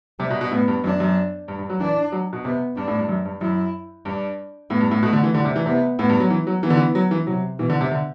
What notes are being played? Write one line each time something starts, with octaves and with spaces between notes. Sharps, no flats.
C3 G3
B2
B2
A2 B3
G2
F#2 D4
F#2
G2
G2
F#3
E3 D4
F#3
B2
C3 B3
G2 D4
A2
G2
F#2
G2
F#2 E4
G2 D4
A2 B3
G2
A2
B2 A3
D3
E3
D3 G3
C3
E3
C3 B3
A2 B3
G2
F#3
E3
F#3
E3 B3
D3
E3
F#3
E3
C3 F#3
B2 E3
D3
C3
D3